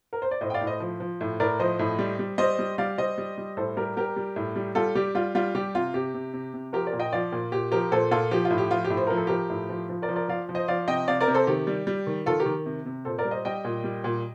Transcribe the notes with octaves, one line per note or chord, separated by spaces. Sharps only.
A#4
C5
D5
A2 C5 D#5
G5
D5 F5
A2
C5 D#5
F3
F3
A2
A2 A#4 D5
F3 C5 D#5
A2
G3
G3
G3 C5 D#5
G3
G3 D5 F5
G3 C5 D#5
G3
G3
A2 A4 C5
G3 G4 A#4
G3 G4 A#4
G3
A2
G3
G3 F4 A4
G3 G4
G3 F4
G3 F4
G3 G4
C3 F4
C3 G4
C3
C3
C3
F3 G4 A#4
A#4 D5
A#2
D#5 G5
F3 D5 F5
A#2
A#2 G4
F3 G4 A#4
A#2 A4 C5
A#2 F4 A4
F3 G4
F4
A2
G4
F3 F4
G4
A2
C5
F3 A#4
A4
F3 G4 A#4
A2
F3
F3
A#4 D5
F3
A#4 D5
F3 D5 F5
F3
C5 D#5
F3 D5 F5
C3 D#5 G5
C3 D5 F5
A#4 D5
C3
A4 C5
D#3 G4
G3
G3
D#3
D#3 F4 A4
G4 A#4
D#3
C3
C3
A#2 A4 C5
A#4 D5
G3
C5 D#5
G3 D#5 G5
A#2
G3
A#2